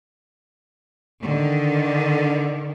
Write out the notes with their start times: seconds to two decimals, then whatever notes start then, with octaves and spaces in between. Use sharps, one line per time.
1.22 D3 D#3